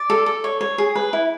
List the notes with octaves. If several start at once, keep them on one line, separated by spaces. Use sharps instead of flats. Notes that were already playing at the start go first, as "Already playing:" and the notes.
Already playing: D5
A4
A4
C#5
C#5
G#4
B4
E4